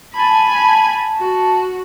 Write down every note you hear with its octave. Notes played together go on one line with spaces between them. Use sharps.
G#5 A5 B5
F#4